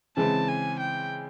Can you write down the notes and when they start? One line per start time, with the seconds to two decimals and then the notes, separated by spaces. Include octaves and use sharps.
0.17 C#3 E3 G#3 C4 A5
0.48 G#5
0.79 G5